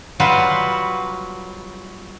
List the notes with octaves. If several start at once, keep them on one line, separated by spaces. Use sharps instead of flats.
F#3 G3 F4 F#4 B4